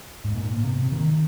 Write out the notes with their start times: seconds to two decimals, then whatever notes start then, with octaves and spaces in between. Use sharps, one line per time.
0.25 G#2
0.35 A#2
0.57 A#2
0.64 C3
0.92 D#3